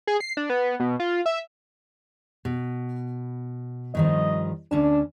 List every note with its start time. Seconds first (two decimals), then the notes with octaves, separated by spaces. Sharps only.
0.07 G#4
0.20 C7
0.37 D4
0.50 B3
0.80 B2
1.00 F4
1.26 E5
2.45 B2
3.95 G2 D#3 F3 D#5
4.71 D2 C#4 D4 A5